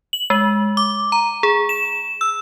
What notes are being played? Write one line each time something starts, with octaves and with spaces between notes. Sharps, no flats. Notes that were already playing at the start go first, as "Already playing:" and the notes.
F#7
G#3
D6
A#5
G#4
E7
E6